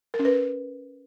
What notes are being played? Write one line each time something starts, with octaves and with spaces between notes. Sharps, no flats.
A#4
C#4
B4